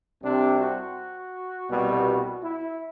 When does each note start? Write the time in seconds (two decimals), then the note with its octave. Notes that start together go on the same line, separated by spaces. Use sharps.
0.22 C2 C3 G3 C4 D4
0.59 F#4
1.69 C2 B2 G3 B3
2.42 E4